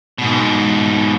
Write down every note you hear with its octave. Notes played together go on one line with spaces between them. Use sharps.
G#2 B2